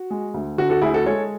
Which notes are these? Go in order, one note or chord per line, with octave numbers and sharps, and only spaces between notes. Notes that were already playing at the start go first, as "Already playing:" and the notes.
Already playing: F#4
G#3
D2
D3 F#4
F#4 A4
D2 E4 G#4
F#4 A4
G#3 A4 C#5